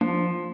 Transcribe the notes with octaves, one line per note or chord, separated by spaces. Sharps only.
F3 A#3 D4